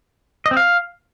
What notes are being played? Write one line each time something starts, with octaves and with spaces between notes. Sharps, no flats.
D#5
C4
F5